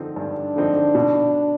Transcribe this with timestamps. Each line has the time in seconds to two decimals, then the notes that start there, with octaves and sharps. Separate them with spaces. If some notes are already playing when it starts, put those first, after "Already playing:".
Already playing: D3 F3 C4 D#4
0.16 G2 D4
0.56 D3 F3 C4 D#4
0.95 B2